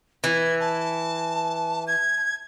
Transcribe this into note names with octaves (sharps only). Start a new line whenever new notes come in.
E3 G#6
A5
G#6